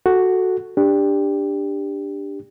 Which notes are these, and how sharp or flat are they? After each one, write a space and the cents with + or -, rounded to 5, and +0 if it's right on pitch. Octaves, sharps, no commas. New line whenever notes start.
F#4 +0 A4 +0
D4 +0 G4 +15